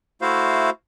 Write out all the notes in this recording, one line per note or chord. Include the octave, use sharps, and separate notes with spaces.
A3 E4 F#4 C5 F5